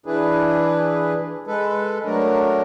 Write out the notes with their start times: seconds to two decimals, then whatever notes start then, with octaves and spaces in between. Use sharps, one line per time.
0.06 E3 D4 E4 G#4 B4
1.47 G#3 A4 B4
2.05 F#3 A3 D4 A#4